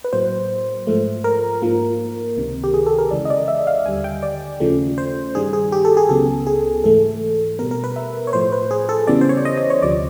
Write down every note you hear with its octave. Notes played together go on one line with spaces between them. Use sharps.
B4
A2 F#3 A#3 C5
G#2 F3 A3
A#4
G#2 F3 A#3
C#2 C3 D#3
G4
G#4
A4
A#4
E2 C#3 E3 G#3 D5
D#5
D5
E5
F5
D#2 D3 G3 G#5
G5
D5
D#2 C#3 F3 A3
C5
G2 D#3 G3 G#4
G#4
G4
A4
G#4
C#2 C#3 F#3 B3 A4
G#4
G#2 E3 A3 A4
B2 G3 B3 A#4
A#4
B4
E5
C#5
A2 F3 A3 C5
B4
G#4
A4
E2 C#3 E3 G3 B3 D5
C5
C#5
D5
D#5
D#5
C#5
D2 C3 F3 D5